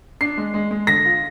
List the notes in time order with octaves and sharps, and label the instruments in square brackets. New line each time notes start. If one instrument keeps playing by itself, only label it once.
[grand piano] D4 C7
G#3
G#3
G#3
D3 A#6
F4